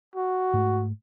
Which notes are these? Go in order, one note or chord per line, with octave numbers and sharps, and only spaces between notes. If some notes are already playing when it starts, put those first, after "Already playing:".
F#4
G#2 A3